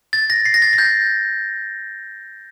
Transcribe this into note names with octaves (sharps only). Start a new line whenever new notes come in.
A6
A#6
C7
A#6
A6
A6
G6